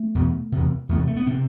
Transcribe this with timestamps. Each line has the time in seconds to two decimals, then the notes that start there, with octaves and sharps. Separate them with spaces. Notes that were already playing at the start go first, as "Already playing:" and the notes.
Already playing: A3
0.15 E2 B2
0.52 E2 C3
0.89 E2 C3 A3
1.07 A3
1.16 B3
1.26 C3 C4